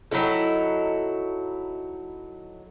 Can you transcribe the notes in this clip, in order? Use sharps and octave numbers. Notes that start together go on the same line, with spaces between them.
F#3 D#4 E4 A4